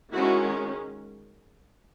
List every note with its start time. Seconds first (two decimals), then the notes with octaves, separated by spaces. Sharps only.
0.12 D#3 G#3 C#4 E4 F#4